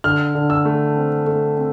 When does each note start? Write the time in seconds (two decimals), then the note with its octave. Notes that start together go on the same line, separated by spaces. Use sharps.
0.04 D3 F6
0.35 D3
0.50 E6
0.65 A3
0.96 C4
1.26 A3
1.57 C4